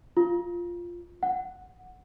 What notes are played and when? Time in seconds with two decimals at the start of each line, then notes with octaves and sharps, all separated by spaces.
0.17 F4
1.23 F#5